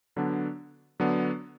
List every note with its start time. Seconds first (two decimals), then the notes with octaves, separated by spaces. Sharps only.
0.16 D3 F#3 B3 D4
1.00 D3 F#3 B3 D4